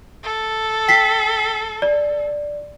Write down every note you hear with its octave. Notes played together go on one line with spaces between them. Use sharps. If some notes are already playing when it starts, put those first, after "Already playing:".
A4
G5 B6 C7
D5